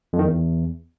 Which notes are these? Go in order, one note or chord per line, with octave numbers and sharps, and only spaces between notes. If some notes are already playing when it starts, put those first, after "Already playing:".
F2
D#3
E2